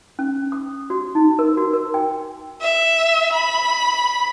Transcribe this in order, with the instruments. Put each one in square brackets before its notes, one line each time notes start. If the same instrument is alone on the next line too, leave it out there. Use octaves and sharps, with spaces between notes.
[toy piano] C#4
D#6
F#4
D#4
A#4
F#4
A#4
G5
[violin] E5
B5